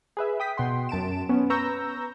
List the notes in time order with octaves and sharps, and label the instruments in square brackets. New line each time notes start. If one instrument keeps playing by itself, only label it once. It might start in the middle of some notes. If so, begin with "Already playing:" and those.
[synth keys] G#4 B4 E5
G5 D#6 B6
B2 F#5 G5 C6
F#2 A5 D7 E7
B3 C#4
B4 A#5 C#6 E6 G6 A#6